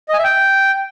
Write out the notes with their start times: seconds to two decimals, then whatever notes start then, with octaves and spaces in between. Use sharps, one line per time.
0.08 D#5
0.14 G#5
0.19 E5
0.24 G5